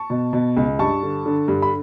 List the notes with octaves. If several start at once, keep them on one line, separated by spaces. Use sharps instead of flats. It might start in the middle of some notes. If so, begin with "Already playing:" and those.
Already playing: A5 C#6
B2
B2
C#2
G2 A5 C#6
D3
D3
G2
B5